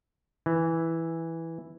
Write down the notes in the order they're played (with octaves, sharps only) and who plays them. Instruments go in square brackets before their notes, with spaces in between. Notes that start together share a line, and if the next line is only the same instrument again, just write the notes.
[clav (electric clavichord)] E3